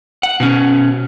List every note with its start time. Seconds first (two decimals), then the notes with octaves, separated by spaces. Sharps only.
0.23 F#5
0.40 B2 C#4